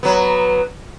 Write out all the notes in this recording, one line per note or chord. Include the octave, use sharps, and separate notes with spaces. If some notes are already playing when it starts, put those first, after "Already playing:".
F#3 B3